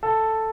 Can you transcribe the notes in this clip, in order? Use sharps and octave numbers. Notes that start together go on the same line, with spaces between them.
A4